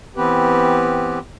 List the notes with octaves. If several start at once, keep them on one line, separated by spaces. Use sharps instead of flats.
E3 B3 C4 G4 B4